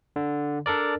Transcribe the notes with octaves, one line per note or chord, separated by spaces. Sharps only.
D3
D4 A4 A#4 D5